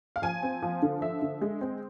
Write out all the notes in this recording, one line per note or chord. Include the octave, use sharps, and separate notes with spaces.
F5
F3 G#5
C4
F3
D3
F3 E5
D3
G#3
C4